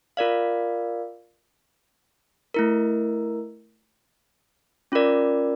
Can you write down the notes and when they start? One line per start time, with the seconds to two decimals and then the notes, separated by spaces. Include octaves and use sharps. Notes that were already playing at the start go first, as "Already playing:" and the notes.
0.17 F4 A#4 D5 F5
2.54 A3 E4 A#4
4.92 C#4 F4 A#4 D5